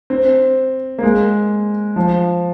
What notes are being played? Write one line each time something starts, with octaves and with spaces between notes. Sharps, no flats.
C4
A#3
G#3
F3